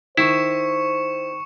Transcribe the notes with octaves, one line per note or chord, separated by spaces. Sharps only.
D#3 E4 C5 C#6 C#7 E7